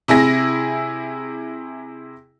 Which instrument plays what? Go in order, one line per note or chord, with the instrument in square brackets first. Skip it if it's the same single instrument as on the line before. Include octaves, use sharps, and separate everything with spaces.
[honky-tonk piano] C3 E4 G#4 A#6